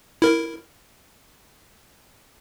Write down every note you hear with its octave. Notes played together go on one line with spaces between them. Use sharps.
E4 A#4